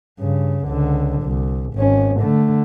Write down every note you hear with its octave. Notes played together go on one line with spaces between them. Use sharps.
G2 C#3
C#2 D3
C2
G#1 C#4
D3 A3